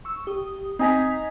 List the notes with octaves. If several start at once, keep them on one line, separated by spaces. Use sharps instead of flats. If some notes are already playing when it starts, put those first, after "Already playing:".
C#6 E6
G4 D#6
C4 D#4 G#5 A#5 G#6 B6